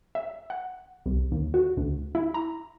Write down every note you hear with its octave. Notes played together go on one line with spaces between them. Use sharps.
E5
F#5
C2
D#2
F#4
D2
E4
A#5